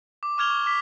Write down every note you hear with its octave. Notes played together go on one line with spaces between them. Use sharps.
D6
C#6 D6 F6 G#6 F7 G7
C#6
D6 B6